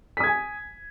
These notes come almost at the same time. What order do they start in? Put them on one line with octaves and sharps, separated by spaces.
B6 D#6 G#6 G#5